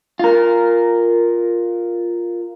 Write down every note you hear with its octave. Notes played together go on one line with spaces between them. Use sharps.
F4 A#4